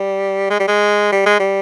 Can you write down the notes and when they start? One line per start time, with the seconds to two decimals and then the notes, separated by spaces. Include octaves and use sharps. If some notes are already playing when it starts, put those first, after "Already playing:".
Already playing: G3
0.50 G#3
0.59 G3
0.67 G#3
1.12 G3
1.26 G#3
1.39 G3